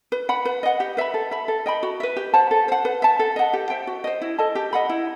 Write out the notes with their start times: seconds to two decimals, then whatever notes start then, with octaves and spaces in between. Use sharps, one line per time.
0.12 B4
0.29 F#5 B5
0.45 B4
0.63 D#5 F#5
0.80 G4
0.97 B4 E5 B5
1.14 A4
1.31 E5 B5
1.48 A4
1.66 D#5 G5 B5
1.83 F#4
2.00 B4 E5
2.17 G4
2.34 C5 F#5 A5
2.51 A4
2.68 C5 F#5
2.85 B4
3.02 E5 A5
3.19 A4
3.36 D#5 F#5
3.53 G4
3.70 C5 E5 G5
3.87 F#4
4.04 C5 D#5
4.22 E4
4.38 A4 D#5 A5
4.55 G4
4.73 D#5 F#5 B5
4.89 E4